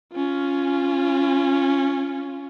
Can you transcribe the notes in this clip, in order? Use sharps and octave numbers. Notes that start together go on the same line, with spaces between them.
C#4 F4